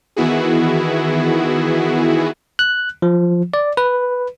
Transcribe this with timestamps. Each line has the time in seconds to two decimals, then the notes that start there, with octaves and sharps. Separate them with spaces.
0.16 D#3 E3 B3 E4 F#4 G#4
2.59 F#6
3.02 F3
3.54 D5
3.77 B4